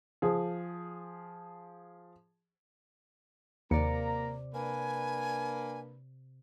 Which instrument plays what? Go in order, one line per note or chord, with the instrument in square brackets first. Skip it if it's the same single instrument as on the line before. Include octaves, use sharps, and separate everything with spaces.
[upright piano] F3 G#4
[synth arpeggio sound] D#2 [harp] C3 D5 C#7 [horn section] A#3 A#5
[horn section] A#3 D4 B4 [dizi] G#5